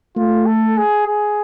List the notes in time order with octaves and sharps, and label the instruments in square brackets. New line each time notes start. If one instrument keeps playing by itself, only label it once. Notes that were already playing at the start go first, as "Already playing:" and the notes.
[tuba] A3 [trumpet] F4
[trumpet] A4
G#4
G#4